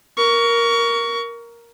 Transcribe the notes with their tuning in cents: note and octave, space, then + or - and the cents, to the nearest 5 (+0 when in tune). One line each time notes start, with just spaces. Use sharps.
A#4 +5 C#6 +25